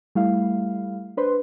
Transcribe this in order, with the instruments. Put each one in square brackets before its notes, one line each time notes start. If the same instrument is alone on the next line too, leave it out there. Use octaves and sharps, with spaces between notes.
[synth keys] G3 A3 E4 F5
D4 B4 C5 C6